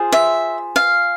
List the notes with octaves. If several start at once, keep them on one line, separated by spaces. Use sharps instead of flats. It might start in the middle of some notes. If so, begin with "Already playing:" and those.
Already playing: F4 G#4 C5
E5
F5